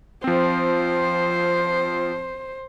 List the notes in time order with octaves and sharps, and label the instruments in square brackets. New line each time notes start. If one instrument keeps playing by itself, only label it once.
[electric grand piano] F3 C4 [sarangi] C5